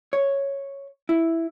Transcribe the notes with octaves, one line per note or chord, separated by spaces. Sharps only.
C#5
E4